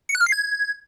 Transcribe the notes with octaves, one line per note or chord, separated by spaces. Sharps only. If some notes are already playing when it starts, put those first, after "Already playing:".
C#7
F#6
F6
C7
G#6